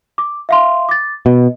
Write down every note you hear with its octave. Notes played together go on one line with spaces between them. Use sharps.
D6
E5 F5 C6
D6 A6
B2 D#5